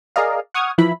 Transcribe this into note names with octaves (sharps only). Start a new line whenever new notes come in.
G#4 A#4 D5 D#5 F5
F#5 C#6 D#6 F6 G#6
E3 F3 E4 B5